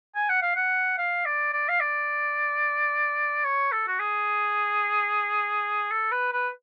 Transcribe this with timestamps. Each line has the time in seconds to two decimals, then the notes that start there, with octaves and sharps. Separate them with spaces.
0.16 G#5
0.29 F#5
0.42 F5
0.56 F#5
0.98 F5
1.25 D5
1.53 D5
1.69 F5
1.80 D5
3.45 C#5
3.72 A4
3.88 F#4
3.99 G#4
5.91 A4
6.12 B4
6.33 B4